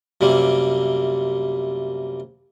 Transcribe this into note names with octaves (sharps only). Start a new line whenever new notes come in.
F#2 C3 G3 A#3 C4